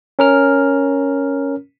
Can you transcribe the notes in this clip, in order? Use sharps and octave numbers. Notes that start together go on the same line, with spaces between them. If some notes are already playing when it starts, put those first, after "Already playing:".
C#4 A#4 F6